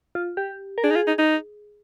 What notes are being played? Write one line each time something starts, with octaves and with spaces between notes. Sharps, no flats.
F4
G4
A#4
D4 G#4
D#4
F4
D#4
D#4